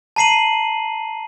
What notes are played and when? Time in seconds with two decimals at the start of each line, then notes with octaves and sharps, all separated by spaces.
0.16 A5 A#5 C7 D#7 F#7